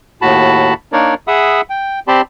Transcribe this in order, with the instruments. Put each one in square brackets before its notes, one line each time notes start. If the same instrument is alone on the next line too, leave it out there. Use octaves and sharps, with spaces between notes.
[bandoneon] D#2 A2 F#4 A5 B5
A#3 D4 D#4 A#4 C#5 D5
G#4 E5 F#5 B5 D#6 E6
G5
C4 G4 D5 A5 B5 C6